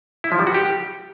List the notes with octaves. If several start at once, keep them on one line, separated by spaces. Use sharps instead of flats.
E4
F3
G3
F#4
G4